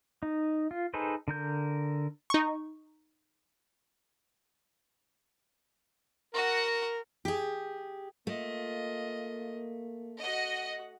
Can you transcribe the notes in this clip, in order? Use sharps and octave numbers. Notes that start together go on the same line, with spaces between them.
D#4
F4
D#4 G#4 A4 B4 C5
D3 A#4 G6
D#4 C#6
F#4 A#4 F#5
G4 G#4
A3 A#3 F4 D#5
F#4 D#5 F#5